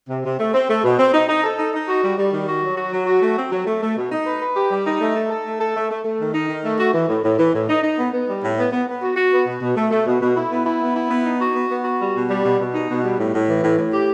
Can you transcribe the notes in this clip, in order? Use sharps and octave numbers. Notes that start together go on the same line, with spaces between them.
C3
C3
A3
C4
A3
B2
C4
D#4
D#4
A4
D#4
D#4
F#4
G3
G3
D#3
F#4
F#3
F#4
F#3
F#4
A3
C4
F#3
A3
A3
B2
D#4
B4
B4
G4
G3
D#4
A3
A4
A4
A3
A4
A3
A3
A3
D#3
D#4
D#3
A3
F#4
E3
A2
A2
E3
A2
D#4
D#4
B3
B3
G3
A2
B3
B3
B3
F#4
F#4
B3
B2
B2
A3
A3
B2
B2
E4
B3
E4
B3
E4
B3
D#4
F#4
B3
B3
F#4
G3
B2
G3
B2
B2
D#4
B2
G3
A2
A2
E3
A2
A2
G4